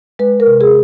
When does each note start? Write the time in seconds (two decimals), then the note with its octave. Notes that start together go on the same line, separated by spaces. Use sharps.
0.19 G#3 B4
0.40 A#4
0.47 C3
0.61 G#4